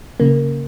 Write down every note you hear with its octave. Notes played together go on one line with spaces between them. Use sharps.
C#3 A#3